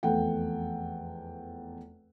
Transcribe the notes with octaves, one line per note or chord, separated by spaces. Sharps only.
F1 E2 A4 F#5 G5